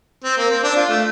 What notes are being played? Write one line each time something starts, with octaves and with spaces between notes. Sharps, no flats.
C4
A#3
C4
D4
F4
A3